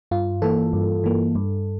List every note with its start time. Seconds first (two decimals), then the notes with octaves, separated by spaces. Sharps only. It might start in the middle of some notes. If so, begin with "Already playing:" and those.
0.11 G2 F4
0.42 E3 A#3 A4
0.73 G2
1.04 E3 A#3
1.35 G2